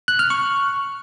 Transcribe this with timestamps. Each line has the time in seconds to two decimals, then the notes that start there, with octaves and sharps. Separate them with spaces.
0.08 F#6
0.19 F6
0.30 C#6